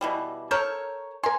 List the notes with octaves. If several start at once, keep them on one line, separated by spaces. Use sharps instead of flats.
B2 E3 G3
A4 A#4 C#5 G6
A#4 G#5 C6